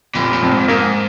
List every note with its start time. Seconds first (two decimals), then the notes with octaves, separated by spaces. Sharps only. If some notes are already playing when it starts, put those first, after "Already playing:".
0.15 F1 A#2
0.33 A#2
0.42 F2
0.51 G#2
0.68 G#2 A#3